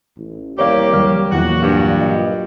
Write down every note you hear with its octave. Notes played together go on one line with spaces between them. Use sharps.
A1
C2 A#3 G4 C#5 D5 F5
D#2 F#3 G3 F6
E2 A#2 E3 F#4
G2
D#5